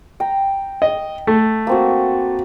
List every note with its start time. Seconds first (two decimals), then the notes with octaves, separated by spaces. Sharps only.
0.20 G5 A#5
0.82 D#5
1.27 A3
1.67 A#3 C4 F#4